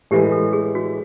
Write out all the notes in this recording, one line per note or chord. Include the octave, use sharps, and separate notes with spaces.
A2 E3 G#3 G4
A4
G#4
F#4